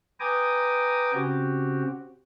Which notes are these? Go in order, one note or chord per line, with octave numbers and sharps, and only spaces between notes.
B4 G5 G#5 A#5 D6 D#6
C#3 C4 F#4 G4